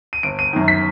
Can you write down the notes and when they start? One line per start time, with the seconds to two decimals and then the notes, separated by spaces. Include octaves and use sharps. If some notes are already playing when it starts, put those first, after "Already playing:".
0.13 D#7
0.23 G1 D7
0.39 D#7
0.53 F#2 D#3
0.68 B6